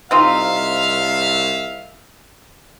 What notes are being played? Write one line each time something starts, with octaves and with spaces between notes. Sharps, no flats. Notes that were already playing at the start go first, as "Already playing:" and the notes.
C2 C4 D#4 F4 E5 F5